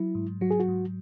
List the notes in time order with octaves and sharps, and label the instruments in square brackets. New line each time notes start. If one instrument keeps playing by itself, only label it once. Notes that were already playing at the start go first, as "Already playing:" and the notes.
Already playing: [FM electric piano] F#3 [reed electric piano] E4
[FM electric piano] G#2
[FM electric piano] F#3 [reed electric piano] F#4
[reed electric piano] G#4
F#4
[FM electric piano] G#2